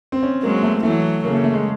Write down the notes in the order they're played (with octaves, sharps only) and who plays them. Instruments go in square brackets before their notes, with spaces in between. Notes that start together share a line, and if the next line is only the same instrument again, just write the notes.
[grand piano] C4
C#4
[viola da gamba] F#3 G#3 [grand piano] A#3
[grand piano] A3
[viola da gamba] E3 F#3 [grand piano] A3
[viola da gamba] C#3 [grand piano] A#3
[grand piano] A3
A3
G#3